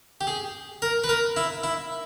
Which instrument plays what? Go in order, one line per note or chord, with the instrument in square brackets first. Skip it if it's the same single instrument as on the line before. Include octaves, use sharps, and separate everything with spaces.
[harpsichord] G4
G#4
A#4
B4
A#4
E4
E4